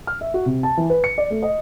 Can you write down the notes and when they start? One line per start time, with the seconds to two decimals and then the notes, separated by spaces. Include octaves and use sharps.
0.07 F6
0.21 E5
0.34 F#4
0.46 C3
0.63 A5
0.77 E3
0.90 B4
1.04 C#7
1.18 D5
1.30 A3
1.43 D#5